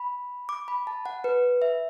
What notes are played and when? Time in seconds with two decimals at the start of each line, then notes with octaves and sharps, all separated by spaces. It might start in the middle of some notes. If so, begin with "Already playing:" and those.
Already playing: B5
0.49 D6
0.68 B5
0.87 A5
1.06 F#5
1.24 B4
1.62 E5